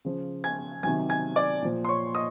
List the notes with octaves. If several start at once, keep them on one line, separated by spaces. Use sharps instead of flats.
C#3 F3
G#5 G#6
C3 D#3 F#3 G#5 G#6
G#5 G#6
D5 D6
A#2 F3
C6
C#5 C#6
D#5 D#6